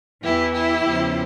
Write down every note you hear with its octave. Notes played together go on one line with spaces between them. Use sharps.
E2 E3 E4 G4
E4 G4
E2 C#3 F3